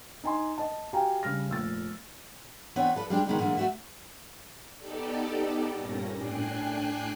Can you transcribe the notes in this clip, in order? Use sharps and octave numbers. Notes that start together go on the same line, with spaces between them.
D#4 G#5 C6
D#5 A5
F#4 G4 F5 G5 G#5 A#5
C#3 G3 F6 A#6
F1 A#2 E6 A6
E3 B3 C4 D4 B4 C#5
F3 A4 B4
G3 G#3 D4 G4
D#3 G#3 B3 D#4
A#2 D3 E3 G#3 A#3
A3 F#4 E5
B3 D#4 G4 A4 D5
G2 A#2 C#4 A#6
A2 D4 G5 G#5 F#6 C7